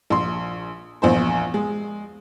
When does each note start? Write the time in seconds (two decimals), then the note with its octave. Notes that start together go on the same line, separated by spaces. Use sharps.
0.10 A#1 C6
1.02 A#1 E2 C5
1.54 G#3